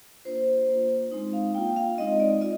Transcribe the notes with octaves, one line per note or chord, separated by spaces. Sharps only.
A#3 D4 F4 C5
A#3 D4 F4
G#3 C4 D#4
F5
A#3 D4 F4 G5
F5
G#3 C4 D#4 D#5
D5
F4 D#5